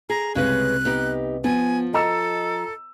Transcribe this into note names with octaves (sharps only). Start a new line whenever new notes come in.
G#4 A#5
C2 C#3 G#3 B4 F#6
B3 D#4 G4
F3 B3 G#5
A4 D#5 A#5 E6